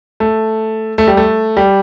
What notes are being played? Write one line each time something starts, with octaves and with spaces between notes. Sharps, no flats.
A3
A3
G3
A3
G3